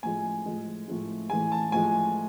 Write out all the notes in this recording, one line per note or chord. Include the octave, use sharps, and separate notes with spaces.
A2 F3 G#3 G#5
A2 F3 G#3
A2 F3 G#3
A2 E3 G#3 G#5
A5
A2 F3 G#3 G#5